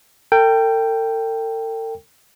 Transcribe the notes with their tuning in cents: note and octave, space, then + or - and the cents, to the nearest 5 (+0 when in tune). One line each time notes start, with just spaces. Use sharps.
A4 +45 G5 +0